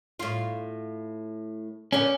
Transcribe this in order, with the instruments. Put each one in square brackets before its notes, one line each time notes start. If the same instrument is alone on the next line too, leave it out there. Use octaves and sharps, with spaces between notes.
[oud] A2 F4
[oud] A#2 D3 B3 [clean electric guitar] C#4